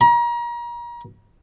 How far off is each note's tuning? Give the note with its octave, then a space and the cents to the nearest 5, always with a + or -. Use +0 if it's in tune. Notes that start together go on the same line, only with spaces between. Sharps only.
A#5 +35